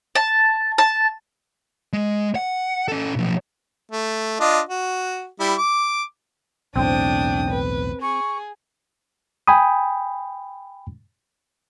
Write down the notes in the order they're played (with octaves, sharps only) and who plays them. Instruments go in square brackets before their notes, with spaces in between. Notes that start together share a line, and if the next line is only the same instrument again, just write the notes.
[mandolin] A5
A5
[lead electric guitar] G#3
F#5
C#4 A4
B1 F3
[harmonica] A3
D4 F4 D#5
F#4
G3 E4
D6
[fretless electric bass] B1 E2 A2 [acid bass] C4 [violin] D4 D#6 [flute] G5
[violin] B4
[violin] G#4 [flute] C#6
[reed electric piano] G5 G#5 B5 D#6